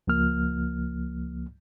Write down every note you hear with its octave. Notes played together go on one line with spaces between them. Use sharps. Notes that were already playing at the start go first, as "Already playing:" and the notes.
C#2 F3 A#3 F6